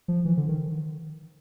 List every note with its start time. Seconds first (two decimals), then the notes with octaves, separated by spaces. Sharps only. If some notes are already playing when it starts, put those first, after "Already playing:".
0.08 F3
0.25 E3
0.37 D3
0.48 D#3